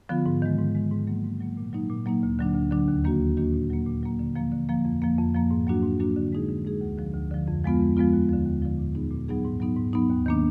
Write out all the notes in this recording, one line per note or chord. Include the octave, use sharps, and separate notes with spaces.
D3 F3 B3 F4
G#2
D#3 G#3
G#2
D#3 G#3
G#2
F#3 A#3
G#2
F#3 A#3
A#2
F#3 A#3 D#4
A#2
F#3 A#3 D#4
D2
D3 F#3 D4
D2
D3 F#3 D4
D#2
D#3 A#3 D4 F#4
D#2
D#3 A#3 D4 F#4
A#2
F#3 A#3
A#2
F#3 A#3
D3
F3 A#3
D3
F3 A#3
F2
F3 A#3
F2
F3 A#3
G#2
F#3 A#3 D4 F#4
G#2
F#3 A#3 D4 F#4
D3
G#3 D#4 G#4
D3
G#3 D#4 G#4
D2
D3 F3
D2
D3 F3
F2
F3 G#3 B3 F4
F2
F3 G#3 B3 F4
D#2
D3 F3
D#2
D3 F3
A#2
F#3 B3 D#4 G#4
A#2
F#3 B3 D#4 G#4
G#2
F#3 B3 D#4
G#2
F#3 B3 D#4
D#2
D#3 A#3 D4